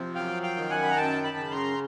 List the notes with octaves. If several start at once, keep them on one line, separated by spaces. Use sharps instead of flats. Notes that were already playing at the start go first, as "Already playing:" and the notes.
Already playing: C3 F3
F#2 F5 G5
F5 G5
D#3
F#5 G#5
B5
A#5
F#2 G5 A5
A5 B5
C#3
A#5 C6